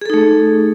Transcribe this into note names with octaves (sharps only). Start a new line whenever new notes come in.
A3 D#4 G#4 A4